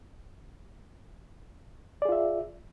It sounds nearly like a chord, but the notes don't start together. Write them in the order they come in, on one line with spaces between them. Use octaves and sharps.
D5 G#4 F4 E5